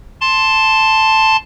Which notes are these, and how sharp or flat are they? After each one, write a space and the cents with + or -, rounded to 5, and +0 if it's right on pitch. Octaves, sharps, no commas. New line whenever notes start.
A5 +0 C6 +5